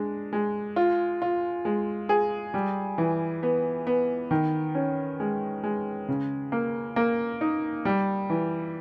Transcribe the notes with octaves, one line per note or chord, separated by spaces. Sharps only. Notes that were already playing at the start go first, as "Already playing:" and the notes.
Already playing: G#3 D4
G#3
F4
F4
G#3
G#4
G3
E3
B3
B3
D#3
C#4
G#3
G#3
C#3
A#3
A#3
D#4
G3
E3